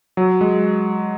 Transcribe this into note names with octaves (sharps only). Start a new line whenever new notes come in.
F#3
G#3